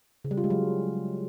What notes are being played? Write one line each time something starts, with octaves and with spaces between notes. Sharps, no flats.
C#3
G3
F4
G#3
F#3